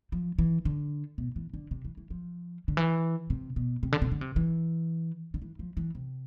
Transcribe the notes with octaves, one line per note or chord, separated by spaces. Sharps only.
F3
E3
D3
B2
E3
D3
C3
E3
E3
F3
D3
E3
C3
B2
C3
D3
C3
D3
C3
E3
D3
E3
F3
E3
C3